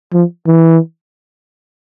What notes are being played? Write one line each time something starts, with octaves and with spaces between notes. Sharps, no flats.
F3
E3